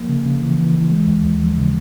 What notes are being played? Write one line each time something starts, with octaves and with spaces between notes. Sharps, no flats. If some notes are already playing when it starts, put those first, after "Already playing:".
Already playing: F3 A#3
C#3
C#3
E3
E3
E3
G#3
D#2
D#2
F3
C#3